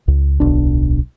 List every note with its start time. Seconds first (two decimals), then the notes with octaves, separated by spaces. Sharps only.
0.08 C#2
0.40 D1 B1 D4